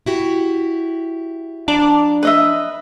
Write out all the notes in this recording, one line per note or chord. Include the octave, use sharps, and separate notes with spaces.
E4 F#4 G4
F3 D4 D5 A#5
B4 D#5 E5